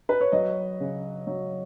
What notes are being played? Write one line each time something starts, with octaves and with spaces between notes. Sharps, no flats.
B4
C#5
F#3 D#5
C#3
F#3